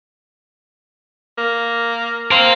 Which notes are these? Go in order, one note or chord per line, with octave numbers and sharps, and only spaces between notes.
A#3
C4 A#4 F5